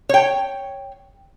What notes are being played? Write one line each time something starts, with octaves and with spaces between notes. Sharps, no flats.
C#5 G5